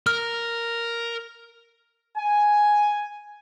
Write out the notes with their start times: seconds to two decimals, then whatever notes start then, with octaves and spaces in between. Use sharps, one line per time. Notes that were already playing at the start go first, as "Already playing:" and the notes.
0.07 A#4 F6
2.18 G#5